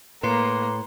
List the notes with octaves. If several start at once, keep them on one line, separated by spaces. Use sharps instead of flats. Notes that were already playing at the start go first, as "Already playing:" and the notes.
A2 A#3 B4 C6